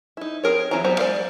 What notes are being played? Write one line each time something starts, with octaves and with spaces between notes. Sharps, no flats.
D#4 E4
C4 G#4 A#4 C#5
E3 C4 F4 C#5 A#5
F#3 G3 B3 C5 A#5
G#3 A4 D5 F5